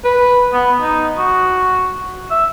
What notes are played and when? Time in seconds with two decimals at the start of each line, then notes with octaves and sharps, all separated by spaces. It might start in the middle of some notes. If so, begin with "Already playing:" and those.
0.04 B4
0.53 B3
0.81 D#4
1.17 F#4
2.31 E5